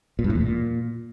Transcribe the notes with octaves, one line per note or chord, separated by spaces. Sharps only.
A#2
G2
A2
E2
A#2